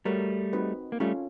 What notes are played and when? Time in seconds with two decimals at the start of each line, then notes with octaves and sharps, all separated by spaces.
0.05 G3 A3 F#4 A#4 C#5
0.53 C4 D#4 F#4 B4 D#5
0.92 A#3
1.00 G3 A3 C#4 F4 A4 C#5 F5